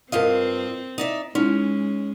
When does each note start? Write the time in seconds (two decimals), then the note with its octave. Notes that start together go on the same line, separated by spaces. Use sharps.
0.12 G2 C4 F4 A#4 D#5 F5
0.98 D#4 D5 E5
1.35 G#3 C#4 D#4 E4